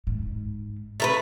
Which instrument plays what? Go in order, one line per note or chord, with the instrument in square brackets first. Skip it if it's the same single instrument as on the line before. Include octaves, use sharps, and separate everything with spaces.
[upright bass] G#2
[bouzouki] A3 A#4 B4